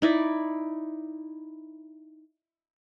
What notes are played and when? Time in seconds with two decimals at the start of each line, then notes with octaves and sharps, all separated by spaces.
0.02 D#4 E4 D5